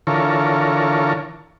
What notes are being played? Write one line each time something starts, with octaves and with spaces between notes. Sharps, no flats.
D3 E3 F4 A4 A#4 C#5